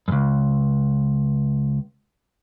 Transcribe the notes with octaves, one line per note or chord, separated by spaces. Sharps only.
C#2 F#2